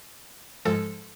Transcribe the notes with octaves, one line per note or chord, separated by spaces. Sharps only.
G#2 F3 G#3 A4